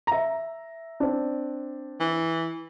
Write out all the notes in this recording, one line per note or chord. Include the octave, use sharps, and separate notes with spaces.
E5 A#5
C4 D4
E3